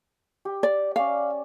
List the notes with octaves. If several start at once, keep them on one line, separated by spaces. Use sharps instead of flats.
G4
D5
C#4 D5 E5 F5